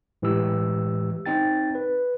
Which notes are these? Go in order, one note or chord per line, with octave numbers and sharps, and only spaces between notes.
A2 E3 G#3 G4 E6
C4 D#4 G5 A6
B4